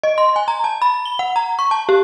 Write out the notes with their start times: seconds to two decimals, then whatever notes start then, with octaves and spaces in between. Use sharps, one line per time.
0.03 D#5
0.18 C6
0.36 G#5
0.48 A#5
0.64 A5
0.82 B5
1.05 G7
1.19 F#5
1.36 A#5
1.59 C#6
1.71 A5
1.89 G4